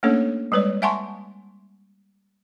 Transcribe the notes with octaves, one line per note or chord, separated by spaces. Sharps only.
A3 A#3 C#4 D4 A4 C#5
G3 G#3 B4 C#5 D5
E5 F#5 G#5 A5 C6 C#6